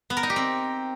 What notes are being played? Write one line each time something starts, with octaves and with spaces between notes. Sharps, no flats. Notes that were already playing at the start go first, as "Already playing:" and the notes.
B3
A#4
D#4
G4
C4